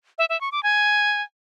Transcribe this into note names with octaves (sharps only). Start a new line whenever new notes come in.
E5
E5
C#6
D6
G#5